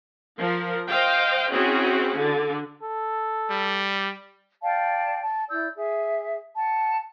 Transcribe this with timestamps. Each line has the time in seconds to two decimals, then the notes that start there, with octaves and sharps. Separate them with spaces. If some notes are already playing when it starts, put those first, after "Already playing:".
0.40 F3 A#4
0.89 C5 D#5 F5 G5
1.52 C4 C#4 E4 F#4 G#4
2.17 D3
2.83 A4
3.50 G3
4.62 D5 F5 G5 A5
5.21 A5
5.50 E4 D5 E6 G6
5.77 G#4 E5
6.56 F#5 A5